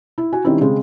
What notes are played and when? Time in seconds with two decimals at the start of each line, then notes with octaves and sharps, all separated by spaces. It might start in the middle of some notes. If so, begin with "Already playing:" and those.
0.18 E4
0.33 F#4 G#5
0.44 D#3 G3 C4 C#4 E4
0.61 C#3 G#3 C4